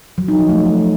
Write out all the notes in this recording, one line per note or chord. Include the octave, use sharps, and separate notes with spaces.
F#3
D#4
F3
A3